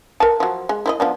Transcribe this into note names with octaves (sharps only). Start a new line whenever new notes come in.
A#4 B4 A5
F3 F#3
G#3
E4 C5 D#5
F3 B3 D4